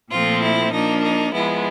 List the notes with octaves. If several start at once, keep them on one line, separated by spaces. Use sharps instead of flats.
A#2 F3 A3 C4 F4
E4
F3 A#3 D4 D#4
D#4
F3 G#3 B3 E4